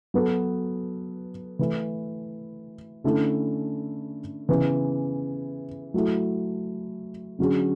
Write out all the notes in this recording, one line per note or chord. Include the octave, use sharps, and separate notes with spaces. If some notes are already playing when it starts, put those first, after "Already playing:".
F#3 B3 F#4 A4
E3 A3 E4
D3 A3 C#4 E4 A4
C#3 E3 B3
F#3 A3 E4
D3 F#3 C#4 G#4